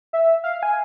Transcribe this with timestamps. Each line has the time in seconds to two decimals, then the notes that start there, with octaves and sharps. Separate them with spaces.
0.13 E5
0.44 F5
0.63 G#5